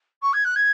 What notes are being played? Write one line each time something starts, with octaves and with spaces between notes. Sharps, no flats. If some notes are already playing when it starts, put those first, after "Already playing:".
C#6
G#6
F#6
G#6